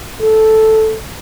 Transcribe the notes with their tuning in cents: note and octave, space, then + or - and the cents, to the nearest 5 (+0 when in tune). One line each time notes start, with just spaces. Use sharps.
A4 -5